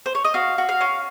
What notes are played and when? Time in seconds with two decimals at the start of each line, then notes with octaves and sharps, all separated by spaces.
0.06 C5
0.15 C#5
0.24 D#5
0.34 F#4 F5
0.58 F#4
0.69 F5
0.81 C#4